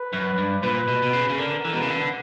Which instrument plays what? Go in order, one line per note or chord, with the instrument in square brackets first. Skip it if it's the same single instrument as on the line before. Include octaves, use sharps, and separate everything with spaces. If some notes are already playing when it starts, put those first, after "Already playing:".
Already playing: [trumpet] B4
[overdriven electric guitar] F#2
G2
[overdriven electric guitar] A#2 [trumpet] B4
[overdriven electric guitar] B2
B2
C#3
C#3
[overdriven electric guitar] D3 [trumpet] A#4
[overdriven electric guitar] E3
[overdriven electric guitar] B2 [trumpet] B4
[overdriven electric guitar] C#3
D3